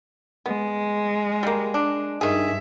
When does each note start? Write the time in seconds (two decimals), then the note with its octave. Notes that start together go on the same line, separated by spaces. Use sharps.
0.46 G#3 B3
1.43 G3 A#3
1.74 D4
2.21 G2 D#3 G#4 E5